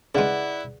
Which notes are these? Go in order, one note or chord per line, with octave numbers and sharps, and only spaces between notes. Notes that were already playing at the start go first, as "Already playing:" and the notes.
C#3 G#3 E4 G#4 B4 D5 F#5